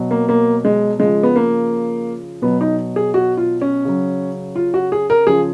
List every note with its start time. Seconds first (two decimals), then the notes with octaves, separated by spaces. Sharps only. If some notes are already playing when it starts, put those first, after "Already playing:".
Already playing: B2 F#3
0.11 A#3
0.29 A#3
0.65 G#3
1.00 C#3 F3 G#3
1.23 B3
1.36 A#3
2.42 B2 F#3 B3
2.61 D#4
2.96 G#4
3.14 F#4
3.37 F4
3.62 C#4
3.85 C#3 F#3
4.56 F4
4.74 F#4
4.92 G#4
5.10 A#4
5.27 C#3 F3 G#4